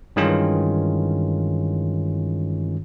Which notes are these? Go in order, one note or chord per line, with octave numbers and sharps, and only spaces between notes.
G2 D#3 E3 G#3 C#4 F4